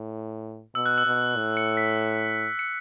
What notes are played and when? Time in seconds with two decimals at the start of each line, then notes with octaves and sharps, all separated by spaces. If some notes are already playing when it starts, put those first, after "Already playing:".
Already playing: A2
0.75 B2 E6
0.86 F#6
0.98 E6
1.06 B2
1.36 A2
1.57 C#7
1.77 B6
2.59 C#7